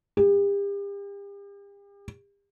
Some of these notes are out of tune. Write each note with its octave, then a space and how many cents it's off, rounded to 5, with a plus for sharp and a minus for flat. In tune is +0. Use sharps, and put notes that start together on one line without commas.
G4 +40